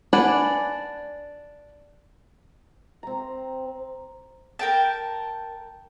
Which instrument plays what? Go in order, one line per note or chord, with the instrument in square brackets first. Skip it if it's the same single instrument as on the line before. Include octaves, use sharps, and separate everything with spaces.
[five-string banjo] D4 B4 D5 F#5 G#5
[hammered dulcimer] C4 A#5
[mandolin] A#4 G5 A5